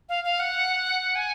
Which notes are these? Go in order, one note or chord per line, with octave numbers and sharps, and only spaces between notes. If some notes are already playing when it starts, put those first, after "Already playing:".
F5
F5
F#5
G#5